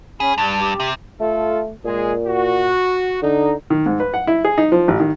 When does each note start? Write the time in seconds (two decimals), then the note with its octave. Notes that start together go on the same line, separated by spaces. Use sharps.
0.20 C#4 G#4 B5
0.38 G2 G3 A5
0.60 G4
0.80 C3
1.21 A3 F4 A4
1.85 A#2 G#3 G#4
2.27 F#4
3.23 D3 D#4
3.70 D#3
3.86 G#2
4.00 B4
4.14 F#5
4.27 E4
4.45 G#4
4.58 D#4
4.72 F3
4.88 A1
5.00 D#3